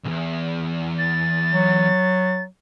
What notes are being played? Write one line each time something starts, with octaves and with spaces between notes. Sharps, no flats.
B1 E2
A6
F#3